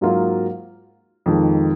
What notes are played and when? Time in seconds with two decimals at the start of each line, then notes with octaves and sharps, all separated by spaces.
0.01 G#2 F#3 A#3 F4
1.26 F2 D#3 G#3